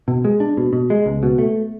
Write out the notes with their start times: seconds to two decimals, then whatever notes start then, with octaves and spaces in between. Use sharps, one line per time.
0.08 B2
0.25 G#3
0.40 D4
0.57 B2
0.73 B2
0.90 G#3
1.06 C#2
1.23 B2
1.38 A3